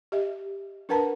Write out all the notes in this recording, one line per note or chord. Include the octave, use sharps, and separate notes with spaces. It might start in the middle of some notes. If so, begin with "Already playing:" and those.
G4 D#5 E5
D4 A#4 B4 F#5 A5 A#5